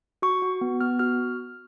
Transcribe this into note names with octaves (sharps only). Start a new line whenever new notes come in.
F#4 C#6
F#4
B3
B3 F6
F#4 F6